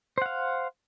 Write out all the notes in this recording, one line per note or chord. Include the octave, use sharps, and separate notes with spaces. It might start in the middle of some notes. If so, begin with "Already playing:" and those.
C5 F5 F#5